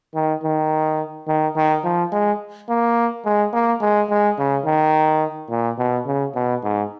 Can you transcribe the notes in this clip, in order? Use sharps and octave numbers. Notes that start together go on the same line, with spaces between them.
D#3
D#3
D#3
D#3
F3
G#3
A#3
G#3
A#3
G#3
G#3
C#3
D#3
A#2
B2
C#3
B2
G#2